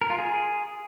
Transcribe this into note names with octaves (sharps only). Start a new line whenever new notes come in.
A#4
F4
G#4